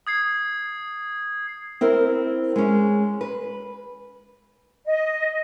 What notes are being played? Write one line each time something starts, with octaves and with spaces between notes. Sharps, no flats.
D#6 G#6 C7
C4 E4 A#4 C5
G#3 C#4
B4
D#5